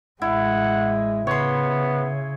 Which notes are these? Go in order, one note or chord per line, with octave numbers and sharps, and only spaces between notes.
A1 G#3 E4 F#5
C#3 B3 C#5 C6